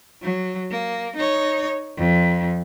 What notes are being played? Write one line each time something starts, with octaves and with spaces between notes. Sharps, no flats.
F#3
A#3
D#4 C#5
F2